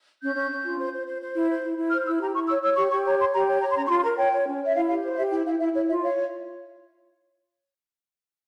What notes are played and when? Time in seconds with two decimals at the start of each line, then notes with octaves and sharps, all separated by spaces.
0.22 C#4 G6
0.36 C#4
0.50 C#4
0.65 F4
0.78 C5
0.93 C5
1.07 C5
1.21 C5
1.35 E4
1.50 C5
1.63 E4
1.77 E4
1.91 C5 F6
2.06 E4 E6
2.21 G4 A#5
2.34 E4 C#6
2.48 C#5 E6
2.62 C#5 E6
2.76 G4 C#6
2.90 G4 C#6
3.05 C#5 A#5
3.18 C#5 C6
3.33 G4 A#5
3.48 C#5
3.61 C#5 A#5
3.70 C6
3.76 C#4 A#5
3.86 C#6
3.90 F4 C6
4.04 A#4 A#5
4.18 C#5 G5
4.32 C#5
4.47 C#4
4.60 C#5 E5
4.74 E4 F5
4.88 G4 F5
5.03 C5
5.13 F5
5.17 G4 E5
5.30 E4 G5
5.45 E4 F5
5.59 E4 E5
5.73 E4 C#5
5.88 F4 E5
6.01 C#5 F5